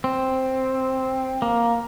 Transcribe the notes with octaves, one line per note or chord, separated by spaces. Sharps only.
C4
A#3